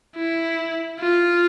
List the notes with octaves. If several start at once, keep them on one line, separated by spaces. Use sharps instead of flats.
E4
F4